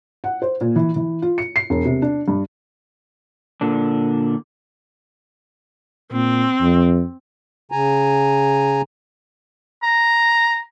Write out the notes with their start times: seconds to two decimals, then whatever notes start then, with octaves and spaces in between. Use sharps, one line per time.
0.24 F#5
0.42 C5
0.61 A#2
0.76 E3
0.96 E3
1.22 F4
1.38 C#7
1.56 C7
1.70 E1
1.85 C3
2.02 D4
2.28 G2
3.61 A#2 D3 D4
6.12 A#2 C4
6.61 F2
7.72 C#3 G#5 A#5
9.83 A#5